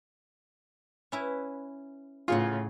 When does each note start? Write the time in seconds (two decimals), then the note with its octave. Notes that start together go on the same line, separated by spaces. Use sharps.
1.12 C#4 E4 B4
2.28 A2 C#3 F4 G#4 C#5 F#5